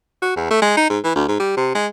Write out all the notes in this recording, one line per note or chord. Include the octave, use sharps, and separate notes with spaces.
F#4
E2
A3
G#3
D#4
G#2
E3
D2
G#2
G3
C3
G#3